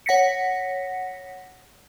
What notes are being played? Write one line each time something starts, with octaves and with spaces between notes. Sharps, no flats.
C#5 F#5 A#6 B6 C#7